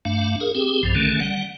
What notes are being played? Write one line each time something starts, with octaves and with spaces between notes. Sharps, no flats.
G2 A3 D4 F5
G#4 A#4
C4 G4 G#4
B1 G2 F3
D3 D#3 A3 C#4
G3 F#5